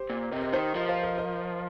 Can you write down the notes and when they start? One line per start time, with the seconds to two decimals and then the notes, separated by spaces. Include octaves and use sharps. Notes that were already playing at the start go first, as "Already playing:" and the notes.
Already playing: G4 C5
0.10 A#2
0.31 C3 A#4 D#5
0.42 A#4 D#5
0.53 D#3 G4 C5
0.74 F3 A#4 D#5
0.89 C5 F5
1.03 A#4 D#5
1.18 A#4 D#5